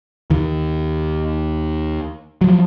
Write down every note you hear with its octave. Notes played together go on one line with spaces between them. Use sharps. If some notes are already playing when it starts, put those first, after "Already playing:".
D#2 D#3
F3 F#3